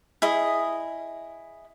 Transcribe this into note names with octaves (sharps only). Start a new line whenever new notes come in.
E4 G#4 D#5